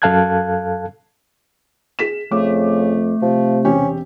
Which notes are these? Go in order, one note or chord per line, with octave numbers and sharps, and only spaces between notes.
F#2 A4 F5 A5 F#6 G#6
G#4 B6 E7
F2 C#3 A3 D6
C3 F3
E1 C4 C#4 G4